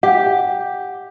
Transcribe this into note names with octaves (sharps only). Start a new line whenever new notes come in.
G4 F#5